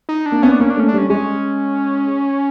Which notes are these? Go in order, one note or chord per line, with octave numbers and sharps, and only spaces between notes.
D#4
D4
A#3
B3 C#4
D4
A#3 C#4
D4
A3 C#4
D4
G3 C#4
G#3 C#4